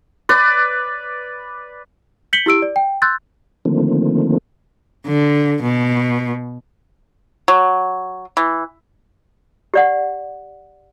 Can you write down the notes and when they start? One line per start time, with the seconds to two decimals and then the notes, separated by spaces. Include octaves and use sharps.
0.29 B4 D5
2.33 G6 B6 C#7 F#7 G7
2.46 E4 G4 E6 D7
2.62 D5
2.76 G5
3.02 C6 E6 F#6 G6 A6
3.65 D3 D#3 F3 A3 A#3 C4
5.07 D3
5.63 B2
7.48 F#3
8.37 E3
9.74 G4 D5 F#5